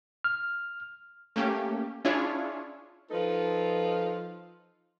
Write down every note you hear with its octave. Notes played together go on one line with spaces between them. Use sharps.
F6
A3 A#3 C#4 G4
C#4 D4 E4 F4 G#4 C#5
F3 D#4 F4 A4 B4